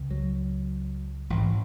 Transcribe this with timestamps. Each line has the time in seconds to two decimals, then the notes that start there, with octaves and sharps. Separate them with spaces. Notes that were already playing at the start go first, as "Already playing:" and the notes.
Already playing: C#2 C#3
0.11 F#3
1.30 A1 G#2 E3
1.42 E3